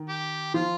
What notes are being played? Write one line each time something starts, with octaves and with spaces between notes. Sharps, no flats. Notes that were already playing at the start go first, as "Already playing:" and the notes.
Already playing: D#3
G4
F3 F4